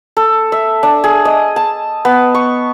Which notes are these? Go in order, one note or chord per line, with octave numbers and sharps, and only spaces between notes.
A4
E5
D4
G#4
D#5
A5
B3
C#6